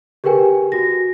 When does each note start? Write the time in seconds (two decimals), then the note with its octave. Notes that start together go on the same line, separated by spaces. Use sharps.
0.24 G4 G#4 A#4 B4 G5 G#5
0.72 F#4 A#6